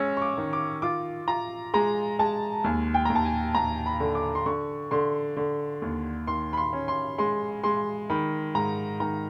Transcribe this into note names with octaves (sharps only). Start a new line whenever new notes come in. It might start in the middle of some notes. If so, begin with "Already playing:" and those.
Already playing: G#3 C#4 E6
C#6
D6
D#3
D6
F4 D6
F4 A#5
G#3 A#5
G#3 A5
D#2 G#5
G5
D#2 A#5
A5
G#5
D#2 A#5
B5
D3
D6
C6
D3 C#6
D3 C6
D3
D#2
D#3 C6
B5
C6
C#4
C6
G#3 C6
G#3 C6
D#3 B5
G#2 A#5
D#3 A#5